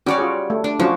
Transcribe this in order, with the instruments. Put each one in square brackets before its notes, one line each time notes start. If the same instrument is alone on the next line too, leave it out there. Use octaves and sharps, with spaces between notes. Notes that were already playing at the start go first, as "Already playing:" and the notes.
[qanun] G3 C#5 D5 [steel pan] C#4 F#4 G4
[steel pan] F4 F#4 G#4
A3
[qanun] D4
[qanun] F3 [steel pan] F#3 C#4 F#4